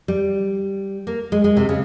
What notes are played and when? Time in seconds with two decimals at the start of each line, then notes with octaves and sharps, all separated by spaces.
0.08 G3
1.07 A#3
1.32 G#3
1.44 G#3
1.57 C3
1.69 C#3